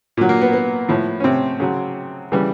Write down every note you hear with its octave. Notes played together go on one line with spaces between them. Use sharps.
A#2 F#3
A#3
B3
B3
A2 F3
C#4
C3 C4
C#3 F#3
C#3 E3 G3